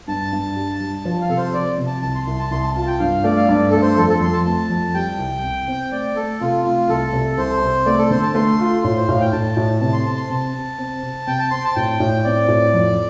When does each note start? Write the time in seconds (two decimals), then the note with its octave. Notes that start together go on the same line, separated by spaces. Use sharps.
0.08 G2 A5
0.33 G2
0.56 G3
0.80 G3
1.05 F3
1.21 F5
1.29 C3 A4
1.37 C5
1.53 F3 D5
1.78 C3
1.87 A5
2.02 C2 A5
2.15 C6
2.26 C2 C6
2.39 A5
2.51 C2 C6
2.63 A5
2.76 F4 A5
2.87 G5
3.00 G2 F5
3.24 A3 D5
3.37 F5
3.49 G2 D5
3.71 A3 A4
3.82 C5
3.97 F2 A4
4.09 A4
4.21 F2 C6
4.33 A5
4.46 A3 A5
4.70 F2
4.94 G3 G5
5.19 C2
5.44 C3
5.68 C4
5.92 A3 D5
6.16 A3 A4
6.41 C3 F4
6.65 A3 F4
6.89 C2 A4
7.13 C3
7.38 C2 C5
7.62 C3
7.86 A3 D5
7.98 A4
8.11 D3 C5
8.22 A5
8.35 A3 C6
8.60 F4
8.83 A2 C6
8.96 C5
9.08 A2 F5
9.20 G5
9.32 A2 A5
9.57 A2
9.81 C3 A5
9.93 C6
10.06 C4 A5
10.17 C6
10.30 C3 A5
10.54 C3
10.78 C4
11.03 C3
11.27 C3 G5
11.39 A5
11.51 C4 C6
11.64 A5
11.75 A2 G5
12.00 A2
12.24 C4 D5
12.48 A2
12.74 F2